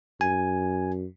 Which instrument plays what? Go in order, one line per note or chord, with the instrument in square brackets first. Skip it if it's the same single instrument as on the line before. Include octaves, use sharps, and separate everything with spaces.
[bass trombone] F#2 [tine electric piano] G#5